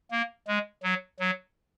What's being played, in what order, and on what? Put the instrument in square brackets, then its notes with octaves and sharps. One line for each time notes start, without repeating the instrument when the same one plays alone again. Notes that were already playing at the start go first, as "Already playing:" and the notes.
[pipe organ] A#3
G#3
F#3
F#3